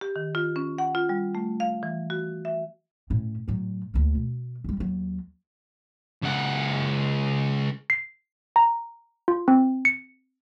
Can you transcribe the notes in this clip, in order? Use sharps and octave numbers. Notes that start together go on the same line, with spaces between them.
G4
D#3
F4
C#4
F#5
F4
G3
A3
F5
E3
F#4
E5
A2 C#4
A2 F#3
D2 A#3
B2
C2 G3
D#2 F#3
C#2 F#5
C7
A#5
F4
C4
C#7